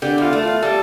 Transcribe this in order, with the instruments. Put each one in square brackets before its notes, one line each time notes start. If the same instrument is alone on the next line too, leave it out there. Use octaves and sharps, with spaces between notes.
[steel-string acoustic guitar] D3 [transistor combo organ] G4
[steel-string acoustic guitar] E2 [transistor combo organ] F4
[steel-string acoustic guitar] A3
[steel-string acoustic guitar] E2 [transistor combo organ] F4
[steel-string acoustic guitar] G3 [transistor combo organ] A4